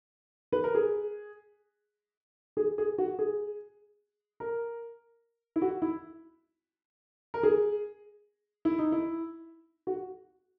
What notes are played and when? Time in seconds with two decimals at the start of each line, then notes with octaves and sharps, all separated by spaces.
0.52 B4
0.64 A#4
0.75 G#4
2.57 G#4
2.78 G#4
2.98 F#4
3.19 G#4
4.40 A#4
5.56 E4
5.62 F#4
5.82 E4
7.34 A#4
7.43 G#4
8.65 E4
8.79 D#4
8.92 E4
9.87 F#4